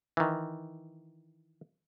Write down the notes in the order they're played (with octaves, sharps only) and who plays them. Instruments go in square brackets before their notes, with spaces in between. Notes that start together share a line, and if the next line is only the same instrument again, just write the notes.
[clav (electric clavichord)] D#3 E3